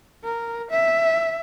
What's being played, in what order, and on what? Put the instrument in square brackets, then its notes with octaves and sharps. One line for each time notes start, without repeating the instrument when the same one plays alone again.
[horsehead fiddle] A#4
E5